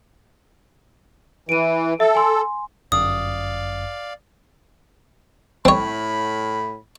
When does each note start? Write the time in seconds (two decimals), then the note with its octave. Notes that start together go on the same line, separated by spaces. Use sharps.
1.49 E3 D7 D#7
2.00 A4 E5
2.15 G#5 C6
2.92 G1 F#2 D5 F5 D#6
5.65 A2 C4 C#5 B5